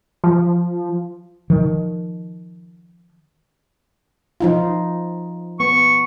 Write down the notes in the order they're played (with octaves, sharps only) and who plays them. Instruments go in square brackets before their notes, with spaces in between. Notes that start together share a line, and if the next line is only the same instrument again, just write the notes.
[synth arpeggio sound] F3
[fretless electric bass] D#3 F3
[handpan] F3 D#4 F4
[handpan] B3 [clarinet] C#6